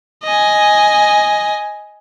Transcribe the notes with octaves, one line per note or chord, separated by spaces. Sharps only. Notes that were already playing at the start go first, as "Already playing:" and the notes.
D#5 G#5